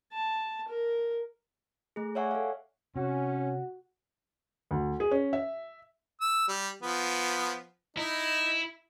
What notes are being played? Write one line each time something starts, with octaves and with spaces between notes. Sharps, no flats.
A5
A#4
A3 G#4
C#5 D5 E5 F#5 G#5 C#6
A4 F5
C3 C#4 F#4
D2
G#4
C#4
E5
E6
G3
F3 B3
D#4 E4